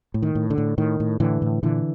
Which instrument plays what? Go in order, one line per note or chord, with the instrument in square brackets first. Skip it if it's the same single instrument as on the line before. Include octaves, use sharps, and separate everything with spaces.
[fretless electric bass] A2
D#3
A2
D3
A2
A2 D#3
A2
A2 D3 E3
A2
A#2 D3 E3